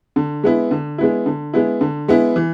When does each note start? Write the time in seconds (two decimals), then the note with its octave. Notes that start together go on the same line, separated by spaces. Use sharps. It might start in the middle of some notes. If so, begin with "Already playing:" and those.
0.16 D3
0.44 G#3 B3 E4
0.71 D3
0.98 G#3 B3 E4
1.26 D3
1.53 G#3 B3 E4
1.81 D3
2.08 G#3 B3 E4
2.36 E3